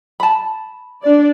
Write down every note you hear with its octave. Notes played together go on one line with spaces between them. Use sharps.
A5 B5
D4 D5